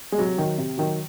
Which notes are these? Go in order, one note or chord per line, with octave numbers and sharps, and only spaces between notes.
G#3
C3 F#3
D#3 F#3
C3
D#3 F#3